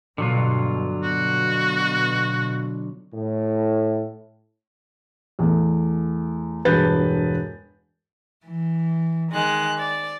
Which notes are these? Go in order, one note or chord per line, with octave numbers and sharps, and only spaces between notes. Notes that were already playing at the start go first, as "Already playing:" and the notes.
G2 B2 D3 F#3 F4
B2 F#4
A2
E2 A3
E1 G2 B4 G6 A6
E3
D#3 G#3 F#6
D5